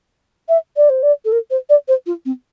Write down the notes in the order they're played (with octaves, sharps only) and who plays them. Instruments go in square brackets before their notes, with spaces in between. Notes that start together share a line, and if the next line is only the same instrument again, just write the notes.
[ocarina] E5
D5
C5
D5
A4
A#4
C5
D5
C5
F4
C4